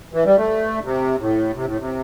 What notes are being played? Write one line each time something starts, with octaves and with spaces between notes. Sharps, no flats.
E3
G3
A3
C3
A2
C3
A2
C3